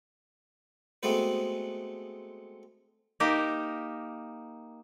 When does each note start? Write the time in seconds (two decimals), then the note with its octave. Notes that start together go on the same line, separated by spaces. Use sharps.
1.03 G#3 A3 B3 C4 F#4 B4
3.20 A#3 D#4 G4 A#4